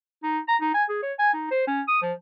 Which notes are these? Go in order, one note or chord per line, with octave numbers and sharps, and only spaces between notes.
D#4
A#5
D#4
G#5
G#4
C#5
G#5
D#4
C5
C#4
D#6
F3